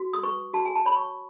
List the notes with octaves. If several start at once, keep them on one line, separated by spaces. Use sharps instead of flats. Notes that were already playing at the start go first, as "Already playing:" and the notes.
Already playing: F#4
D#6
B4 C#6
F#4 A5
G#5
A5
C#5 B5
C#6